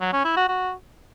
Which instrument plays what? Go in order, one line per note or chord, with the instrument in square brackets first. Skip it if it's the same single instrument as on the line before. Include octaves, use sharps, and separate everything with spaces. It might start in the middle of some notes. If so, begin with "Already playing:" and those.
[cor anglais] F#3
C#4
E4
F#4
F#4